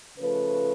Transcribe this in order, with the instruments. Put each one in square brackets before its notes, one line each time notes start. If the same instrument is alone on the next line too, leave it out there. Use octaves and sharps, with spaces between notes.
[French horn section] C#3 F3 A3 B4